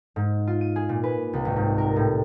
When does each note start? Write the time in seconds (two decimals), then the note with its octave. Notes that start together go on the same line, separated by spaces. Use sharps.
0.16 G#2
0.47 F4
0.61 D#7
0.76 G#4
0.89 A#2
1.04 B4
1.33 C2
1.45 G#1
1.56 G#2
1.78 A#4
1.96 A2